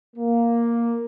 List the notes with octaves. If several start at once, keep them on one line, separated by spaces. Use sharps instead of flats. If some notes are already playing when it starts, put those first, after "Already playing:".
A#3